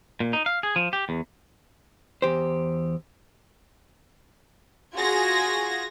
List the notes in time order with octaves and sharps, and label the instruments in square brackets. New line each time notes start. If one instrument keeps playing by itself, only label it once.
[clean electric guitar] A#2
D#4
F5
G#4
F3
G4
E2
[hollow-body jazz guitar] E2 G4 C5
[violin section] F4 F#4 G#4 G#6 A#6